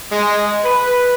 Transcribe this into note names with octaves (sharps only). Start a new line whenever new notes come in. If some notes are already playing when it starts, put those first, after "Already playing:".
G#3
B4